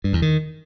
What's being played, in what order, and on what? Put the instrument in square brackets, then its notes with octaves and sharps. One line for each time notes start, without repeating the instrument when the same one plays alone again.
[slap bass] G2
E2
D#3